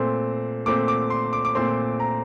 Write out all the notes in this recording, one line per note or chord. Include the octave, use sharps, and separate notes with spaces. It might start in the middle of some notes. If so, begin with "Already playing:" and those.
Already playing: A#2 A3 C4 C6
A#2 A3 C4 D6
D6
C6
D6
D6
A#2 A3 C4 C6
A#5